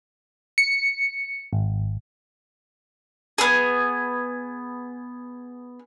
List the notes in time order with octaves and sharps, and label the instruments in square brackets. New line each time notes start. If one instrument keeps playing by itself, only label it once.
[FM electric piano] C#7
G#1
[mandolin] B3 G#4